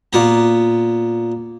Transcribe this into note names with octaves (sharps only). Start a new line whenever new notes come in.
A#2 B3 A#5